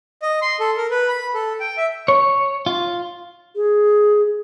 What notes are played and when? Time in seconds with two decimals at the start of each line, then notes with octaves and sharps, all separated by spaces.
0.22 D#5
0.42 C6
0.60 A4
0.77 A#4
0.91 B4
1.09 B5
1.34 A4
1.60 G5
1.78 E5
2.08 C#5
2.66 F4
3.55 G#4